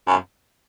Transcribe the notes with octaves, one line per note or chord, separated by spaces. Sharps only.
F#2